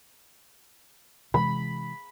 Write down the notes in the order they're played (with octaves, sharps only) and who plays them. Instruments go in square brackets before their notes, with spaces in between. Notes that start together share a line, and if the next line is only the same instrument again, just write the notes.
[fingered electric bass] C3 E3 G#3 [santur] B5